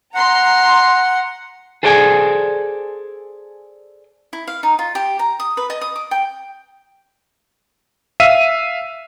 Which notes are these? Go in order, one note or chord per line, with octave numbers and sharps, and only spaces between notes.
F#5 A#5 C6
G#4 A4 C5 D5 G5 G#5
E4
F5
D#4
F4
G4
A#5
D#6
B4
D#5
D#6
D6
G5
E5 F5 D#7